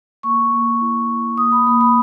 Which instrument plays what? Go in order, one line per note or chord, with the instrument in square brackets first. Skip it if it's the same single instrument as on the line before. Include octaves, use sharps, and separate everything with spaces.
[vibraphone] A#3 C#6
A#3
E4
E4
A#3 D#6
B5
A#3 B5
B5